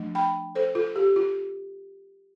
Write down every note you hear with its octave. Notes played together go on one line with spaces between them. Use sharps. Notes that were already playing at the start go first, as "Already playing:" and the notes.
Already playing: F3 A3 D4
G5 B5
A4 C5
F4 A4
G4
F4